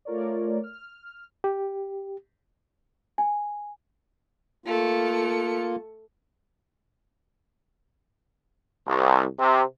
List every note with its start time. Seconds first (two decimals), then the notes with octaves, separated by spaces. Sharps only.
0.05 A3 F4 A#4 C#5 D5
0.63 F6
1.44 G4
3.18 G#5
4.66 A3 A#3 F4 C#7
8.87 C2
9.39 C3